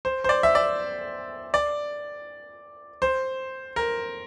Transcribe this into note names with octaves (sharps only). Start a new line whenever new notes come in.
C5
C5
D5
E5
D5
D5
C5
A#4